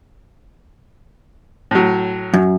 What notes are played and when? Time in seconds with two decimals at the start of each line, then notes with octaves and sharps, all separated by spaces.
1.71 A2 F#3
2.34 F#2